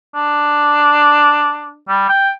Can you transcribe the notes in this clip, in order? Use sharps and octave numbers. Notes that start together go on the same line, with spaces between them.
D4
G3
G5